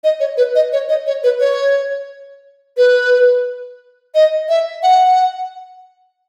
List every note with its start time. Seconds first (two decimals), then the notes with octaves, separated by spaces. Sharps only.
0.04 D#5
0.20 C#5
0.37 B4
0.55 D#5
0.72 C#5
0.89 D#5
1.07 C#5
1.24 B4
1.40 C#5
2.77 B4
4.15 D#5
4.49 E5
4.83 F#5